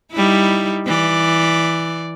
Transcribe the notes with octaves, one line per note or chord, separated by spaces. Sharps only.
G3 D#4 E4
E3 D5